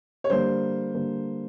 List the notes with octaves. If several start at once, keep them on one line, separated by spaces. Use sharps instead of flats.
C#5
D3 G3 A#3 C5
D3 G3 A#3